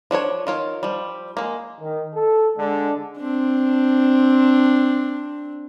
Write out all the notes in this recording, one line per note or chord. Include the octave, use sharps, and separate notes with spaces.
F3 D4 A4 C#5
D#3 F4 C#5
F3 G3
G#3 A#3
D#3
A4
D3 G#3 D4
C4 D4